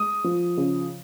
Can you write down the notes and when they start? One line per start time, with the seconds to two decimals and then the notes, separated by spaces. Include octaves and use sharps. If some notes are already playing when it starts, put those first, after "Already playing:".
Already playing: G#3 D#6
0.24 F3
0.57 C#3